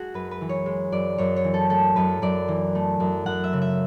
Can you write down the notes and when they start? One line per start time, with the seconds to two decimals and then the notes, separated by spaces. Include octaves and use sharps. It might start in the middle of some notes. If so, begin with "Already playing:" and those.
Already playing: G#3 F#4 G#4
0.14 F#2 B4
0.31 B4
0.41 E3
0.49 C#5
0.66 G#3
0.92 F#2 D5
1.18 F#2 C#5
1.36 C#5
1.44 E3
1.54 A4
1.70 A3 A4
1.96 F#2 B4
2.22 F#2 D5
2.48 E3
2.75 A3
3.00 F#2
3.26 F#2 F#5
3.44 E5
3.53 C#3
3.62 E5